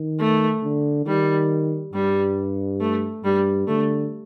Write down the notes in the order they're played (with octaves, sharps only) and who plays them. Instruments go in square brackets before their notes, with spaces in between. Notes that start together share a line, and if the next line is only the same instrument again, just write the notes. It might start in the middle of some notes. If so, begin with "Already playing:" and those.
Already playing: [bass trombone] D#3
[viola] A3
[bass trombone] D3
[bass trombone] D#3 [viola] G3
[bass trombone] G2 [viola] G3
[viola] A3
[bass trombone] G2 [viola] G3
[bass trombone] D3 [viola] A3